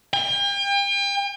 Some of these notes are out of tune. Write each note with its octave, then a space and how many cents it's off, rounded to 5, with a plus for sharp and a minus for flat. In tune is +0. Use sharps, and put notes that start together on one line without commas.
G5 +40